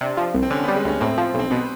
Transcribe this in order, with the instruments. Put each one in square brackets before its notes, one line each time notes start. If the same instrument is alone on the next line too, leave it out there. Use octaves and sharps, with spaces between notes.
[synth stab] C3 [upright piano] D4
[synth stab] F3
C2
[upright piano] C4
[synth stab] D3 [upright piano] C#4
[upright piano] B3
[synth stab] G3
[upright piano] G#3
[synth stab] D2 [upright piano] C#4
[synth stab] A2 [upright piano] C4
[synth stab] F3
[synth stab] B1 [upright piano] C4
[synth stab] B2 [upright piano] B3